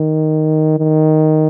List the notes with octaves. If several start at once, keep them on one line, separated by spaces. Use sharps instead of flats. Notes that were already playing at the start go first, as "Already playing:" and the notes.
Already playing: D#3
D#3